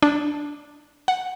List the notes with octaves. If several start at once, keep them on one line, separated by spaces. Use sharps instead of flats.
D4
F#5